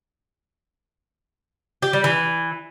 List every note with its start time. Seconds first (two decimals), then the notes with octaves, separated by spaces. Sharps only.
1.82 G4
1.93 G3
2.04 E3